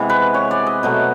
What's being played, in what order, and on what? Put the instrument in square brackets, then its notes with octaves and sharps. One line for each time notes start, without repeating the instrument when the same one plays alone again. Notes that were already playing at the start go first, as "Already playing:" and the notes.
Already playing: [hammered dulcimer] C3 E3 G#3 B3
B4
C#5
D5
D#5
B2 F#3 A3